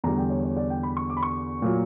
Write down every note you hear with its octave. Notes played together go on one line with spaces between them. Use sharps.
E2 D3 G3 A#5
G5
C#5
C#5
D5
G5
B5
C#6
D6
B5
C#6
A#2 F#3